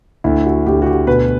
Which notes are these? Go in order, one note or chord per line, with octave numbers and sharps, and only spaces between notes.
D2 E4
F#4
D2 G4
F#4
G4
B2 B4